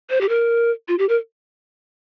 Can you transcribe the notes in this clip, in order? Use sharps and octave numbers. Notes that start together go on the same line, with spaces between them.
C5
G4
A#4
F4
G4
A#4